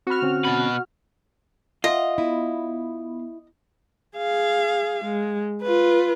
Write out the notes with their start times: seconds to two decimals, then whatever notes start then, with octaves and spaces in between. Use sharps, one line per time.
0.07 C4 F#4 B5 F6
0.22 D3 C4 C#4
0.45 B2 B4
1.84 F4 D#5 E5 F#5
2.18 B3 E4
4.17 G#4 F5
5.04 G#3
5.63 F4 B4